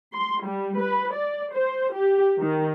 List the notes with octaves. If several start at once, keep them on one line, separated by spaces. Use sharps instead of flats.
C6
G3
B4
D5
C5
G4
D#3